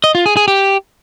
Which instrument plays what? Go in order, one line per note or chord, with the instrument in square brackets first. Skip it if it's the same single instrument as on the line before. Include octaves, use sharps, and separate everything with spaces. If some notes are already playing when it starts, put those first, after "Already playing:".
[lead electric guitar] D#5
F4
G#4
G#4
G4